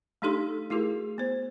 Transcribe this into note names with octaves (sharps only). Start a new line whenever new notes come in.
A3 D4 D#4 G4 A4 C6
A3 E4 F#4 G#4 A#4
B3 C5